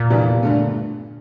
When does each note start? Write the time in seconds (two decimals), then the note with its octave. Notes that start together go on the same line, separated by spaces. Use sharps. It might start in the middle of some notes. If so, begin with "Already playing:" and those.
Already playing: A#2
0.10 F1 E2 E3 G3 D4
0.43 G2 D3 A3